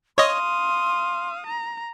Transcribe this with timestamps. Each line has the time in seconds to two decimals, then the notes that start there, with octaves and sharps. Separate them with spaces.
0.18 C#5 D#5 F5 C6 D#6
1.47 A#5